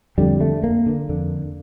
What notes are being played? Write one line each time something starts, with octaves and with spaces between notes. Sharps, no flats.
F2 D3 G3
A3
A#3
D3
F2 D3